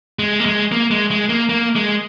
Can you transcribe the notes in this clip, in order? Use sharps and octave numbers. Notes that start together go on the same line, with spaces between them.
G#3
A#3
G#3
A#3
G#3
G#3
A#3
A#3
G#3